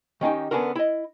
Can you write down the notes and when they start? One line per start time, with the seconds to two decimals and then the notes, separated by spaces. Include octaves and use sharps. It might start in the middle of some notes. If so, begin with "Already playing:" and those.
0.21 D#3 C#4 D#4 G4
0.51 D3 B3 C#4 D4 F#4 A#4
0.75 E4 D#5